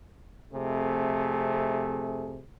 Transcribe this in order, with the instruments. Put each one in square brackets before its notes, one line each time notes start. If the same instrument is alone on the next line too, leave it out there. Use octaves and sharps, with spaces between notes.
[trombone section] F2 C3 A3 G#4